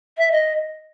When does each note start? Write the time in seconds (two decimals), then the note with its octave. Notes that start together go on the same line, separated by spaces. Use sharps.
0.17 E5
0.31 D#5